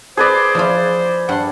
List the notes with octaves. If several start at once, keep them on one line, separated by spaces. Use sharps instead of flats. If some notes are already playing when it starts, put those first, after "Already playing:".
G#4 B4 C5 D5
F3 E4 F4
G2 F#5 C6